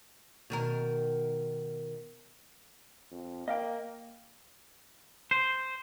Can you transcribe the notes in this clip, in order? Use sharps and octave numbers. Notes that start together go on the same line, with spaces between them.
B2 D#3 A#4
F2
A#3 D#5 F5 G5
C5